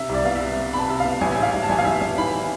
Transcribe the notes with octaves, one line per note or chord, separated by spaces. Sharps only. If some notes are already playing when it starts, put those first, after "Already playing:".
Already playing: C3 E5
C2 D5
B3 F5
C3 E5
B3
C3 A5 B5
C3 E5
B3 F5
A1 G#5
G#2 E5
F5
A1
A5
A1 G#5
F5
A1 E5
A1
E3 B5